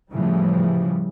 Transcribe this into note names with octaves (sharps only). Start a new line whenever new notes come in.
A2 C#3 E3 F3 G3